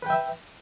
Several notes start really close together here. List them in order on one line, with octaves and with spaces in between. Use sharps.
B4 G5 E5